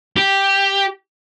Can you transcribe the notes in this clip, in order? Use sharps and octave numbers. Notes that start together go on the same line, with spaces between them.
G4